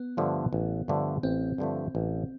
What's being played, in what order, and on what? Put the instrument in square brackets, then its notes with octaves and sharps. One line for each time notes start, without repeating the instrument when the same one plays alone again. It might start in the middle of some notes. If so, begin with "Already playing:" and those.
Already playing: [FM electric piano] B3
[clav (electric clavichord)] G2 D3 F3 A3
A1
G2 D3 F3 A3
[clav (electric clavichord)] A1 [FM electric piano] C4
[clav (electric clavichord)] G2 D3 F3 A3
A1